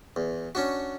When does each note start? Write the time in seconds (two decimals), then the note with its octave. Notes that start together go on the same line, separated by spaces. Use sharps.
0.16 E2
0.55 C#4 D4 F#4